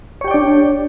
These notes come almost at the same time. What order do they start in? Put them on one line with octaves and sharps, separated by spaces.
C#5 G4 G5 D5 D4